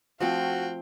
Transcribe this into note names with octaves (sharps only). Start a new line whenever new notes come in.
F3 A3 C4 F#4 F5 G5